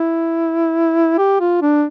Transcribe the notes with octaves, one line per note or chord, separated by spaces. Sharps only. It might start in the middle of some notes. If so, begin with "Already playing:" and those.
Already playing: E4
G4
F4
D4